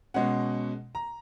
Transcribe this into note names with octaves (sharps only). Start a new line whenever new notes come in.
B2 G#3 C#4 F#5
A#5